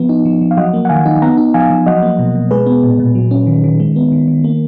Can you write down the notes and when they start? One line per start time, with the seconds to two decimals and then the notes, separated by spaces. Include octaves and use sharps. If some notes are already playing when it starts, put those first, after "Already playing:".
Already playing: F3 B3
0.09 D#4
0.25 F3
0.41 F3
0.51 F5
0.57 F#3 D#5 F#5
0.73 A#3
0.85 F#5
0.89 D#3 F5 G#5
1.06 D#4
1.22 B3 F#5 A#5
1.38 D#4
1.54 F3 F5 G#5
1.70 F3
1.86 F#3 D#5 F#5
2.03 A#3
2.19 B2
2.35 B2
2.51 G#3 G#4 B4
2.67 B3
2.83 A#2
2.99 A#2
3.15 F#3
3.31 C#4
3.47 D#3
3.64 D#3
3.80 G#3
3.96 B3
4.12 D#3
4.28 D#3
4.44 A#3